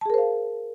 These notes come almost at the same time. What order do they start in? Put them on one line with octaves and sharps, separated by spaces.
A5 G#4 A#4 C5 F5